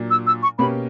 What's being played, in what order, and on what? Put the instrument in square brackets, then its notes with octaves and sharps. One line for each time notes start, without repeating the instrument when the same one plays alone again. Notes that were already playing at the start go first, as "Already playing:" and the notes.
Already playing: [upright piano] A#2 F#3 A#3 D4
[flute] E6
E6
C#6
[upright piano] B2 A#3 C#4 G4 [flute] B5